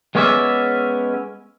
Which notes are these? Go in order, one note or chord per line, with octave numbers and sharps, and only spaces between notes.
G#3 B3 C#4 C#5 D5 E5